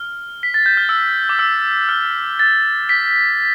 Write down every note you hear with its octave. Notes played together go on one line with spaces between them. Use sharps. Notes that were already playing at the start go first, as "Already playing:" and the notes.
Already playing: F6
B6
A6
G6
F6
E6
D6
E6
F6
A6
B6